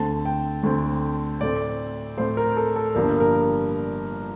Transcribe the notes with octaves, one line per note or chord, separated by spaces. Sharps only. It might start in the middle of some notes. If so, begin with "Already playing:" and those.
Already playing: D2 D3 A3 C4 A5
G5
D2 D3 A3 C4
A2 A3 C4 D5
A2 A3 C4 C5
A#4
A4
A4
G1 G2 F3 A#3 D4 A#4
A#4